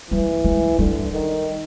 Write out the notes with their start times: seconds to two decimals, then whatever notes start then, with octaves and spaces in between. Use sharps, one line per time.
0.11 E3 G3
0.45 G#3
0.79 D3 G3
1.13 D#3